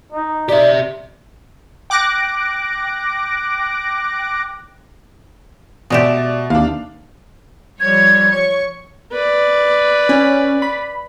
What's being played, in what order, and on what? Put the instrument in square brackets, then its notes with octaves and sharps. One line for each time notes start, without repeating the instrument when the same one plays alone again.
[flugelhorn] D#4
[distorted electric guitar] G4 E5 [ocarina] D5
[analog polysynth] G5 D6 F#6 A#6 D7
[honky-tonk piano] B2 D5 E7 [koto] G#3 A3 G4
[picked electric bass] D#2 [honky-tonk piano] D4 F5
[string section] F3 C#5 [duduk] G3 [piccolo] G#6
[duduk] C#5 [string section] C#6
[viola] B4 D5
[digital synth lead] C#4
B5